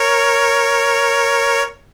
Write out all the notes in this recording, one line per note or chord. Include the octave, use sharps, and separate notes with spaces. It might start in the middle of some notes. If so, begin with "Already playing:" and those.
Already playing: A#4 C#5